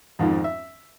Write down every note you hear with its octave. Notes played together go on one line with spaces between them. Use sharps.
F2 G#2 D#3 F3
E5